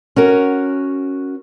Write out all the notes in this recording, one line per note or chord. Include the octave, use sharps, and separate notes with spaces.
C#4 F#4 A#4